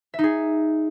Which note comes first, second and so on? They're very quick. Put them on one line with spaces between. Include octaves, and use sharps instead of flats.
E5 D#4 G#4